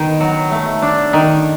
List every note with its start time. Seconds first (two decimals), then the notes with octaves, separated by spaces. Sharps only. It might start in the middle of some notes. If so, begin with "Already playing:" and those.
Already playing: D#3 B3 D#4
0.20 F#3
0.51 A3
0.82 D4
1.13 D#3